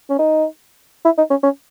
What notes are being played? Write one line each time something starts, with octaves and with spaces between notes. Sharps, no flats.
C#4
D#4
E4
D#4
C#4
C#4